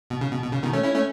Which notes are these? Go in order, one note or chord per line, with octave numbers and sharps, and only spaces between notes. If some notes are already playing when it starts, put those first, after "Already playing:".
B2
C#3
B2
B2
C#3
B2 D#3
A3 C#4
C#4 E4
A3 C#4